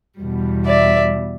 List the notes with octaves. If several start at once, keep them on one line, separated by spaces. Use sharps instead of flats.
E2 B2 G3
D5 E5